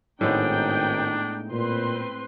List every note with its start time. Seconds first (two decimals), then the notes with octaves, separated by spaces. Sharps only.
0.21 G#1 A2 G#3 B3 D4 D#4 G5
1.51 A#2 C4 B4 C6